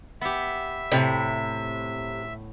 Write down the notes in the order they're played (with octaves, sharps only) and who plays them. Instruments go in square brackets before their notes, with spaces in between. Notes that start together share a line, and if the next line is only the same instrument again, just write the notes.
[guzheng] B3 G4 [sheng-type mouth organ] E5
[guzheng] A2 [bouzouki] C3